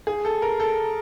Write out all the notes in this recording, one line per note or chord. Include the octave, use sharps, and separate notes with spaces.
G#4
A4
A#4
A4